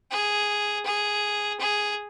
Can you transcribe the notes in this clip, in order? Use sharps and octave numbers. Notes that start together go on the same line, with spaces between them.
G#4
G#4
G#4